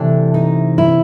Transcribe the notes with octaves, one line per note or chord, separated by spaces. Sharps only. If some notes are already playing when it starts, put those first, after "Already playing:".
Already playing: C3 E3 A3 D4
D#4
E4